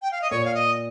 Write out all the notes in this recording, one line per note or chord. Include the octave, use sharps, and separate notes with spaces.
G5
F5
D#5
A#2 C#5
F5
D#5